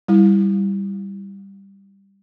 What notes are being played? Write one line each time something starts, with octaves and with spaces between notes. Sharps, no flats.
G3 E4